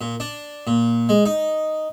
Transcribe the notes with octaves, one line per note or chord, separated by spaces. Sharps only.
A#2
D4
A#2
G#3
D#4